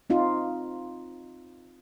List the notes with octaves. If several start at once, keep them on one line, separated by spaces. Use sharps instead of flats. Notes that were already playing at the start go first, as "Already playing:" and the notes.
C4 D#4 F4